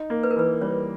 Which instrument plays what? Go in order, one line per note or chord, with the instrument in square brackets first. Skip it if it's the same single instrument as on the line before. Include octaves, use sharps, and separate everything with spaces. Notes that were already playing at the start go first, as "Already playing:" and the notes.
Already playing: [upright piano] D#4
A#3
[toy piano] B4
A#4
[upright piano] E3 [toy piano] B4
[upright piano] G3 [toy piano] C#5